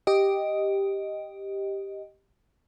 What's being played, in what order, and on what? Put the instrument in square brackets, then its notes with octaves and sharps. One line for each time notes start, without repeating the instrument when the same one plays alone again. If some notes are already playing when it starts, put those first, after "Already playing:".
[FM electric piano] G4 D#5